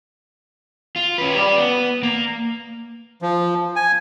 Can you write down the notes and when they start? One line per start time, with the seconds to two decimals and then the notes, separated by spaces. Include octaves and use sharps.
0.96 F4
1.18 C#4 B4
1.35 G4 D5
1.58 B3
2.03 A#3
3.22 F3
3.76 G#5